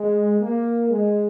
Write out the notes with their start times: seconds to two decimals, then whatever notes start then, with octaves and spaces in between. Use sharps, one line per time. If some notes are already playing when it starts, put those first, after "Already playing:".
Already playing: G#3
0.41 A#3
0.90 G#3